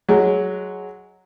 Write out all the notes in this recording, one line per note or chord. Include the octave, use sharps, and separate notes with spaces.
F#3 G#3